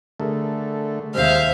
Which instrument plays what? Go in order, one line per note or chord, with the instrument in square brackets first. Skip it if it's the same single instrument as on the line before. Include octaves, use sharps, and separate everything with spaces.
[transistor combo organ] D3 A3 [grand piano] G#4 A#4
[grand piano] D#2 C3 [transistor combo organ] G#3 [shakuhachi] C5 [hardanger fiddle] E5 F5